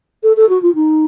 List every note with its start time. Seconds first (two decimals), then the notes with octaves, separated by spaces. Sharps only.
0.23 A4
0.37 A4
0.49 F#4
0.62 F4
0.75 D#4